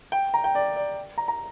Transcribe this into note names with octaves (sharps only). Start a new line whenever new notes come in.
G5
A#5
G5
D5
D5
A#5
A#5